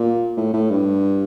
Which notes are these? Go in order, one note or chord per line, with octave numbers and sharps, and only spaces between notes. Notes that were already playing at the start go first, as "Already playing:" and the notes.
Already playing: A#2
A2
A2
G2